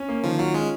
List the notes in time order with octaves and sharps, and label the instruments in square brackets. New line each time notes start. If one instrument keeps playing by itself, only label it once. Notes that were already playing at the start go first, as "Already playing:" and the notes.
Already playing: [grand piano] C#4
A#3
[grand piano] D#3 [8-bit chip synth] F3
[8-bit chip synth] F#3 [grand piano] F4
[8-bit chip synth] G#3 [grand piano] C#4